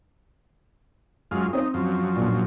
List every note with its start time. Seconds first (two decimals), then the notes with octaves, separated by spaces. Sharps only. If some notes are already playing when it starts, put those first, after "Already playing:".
1.31 F#2 G#3 F4
1.53 C4 D#4 C5
1.74 F#2 F3
2.16 A#2 D4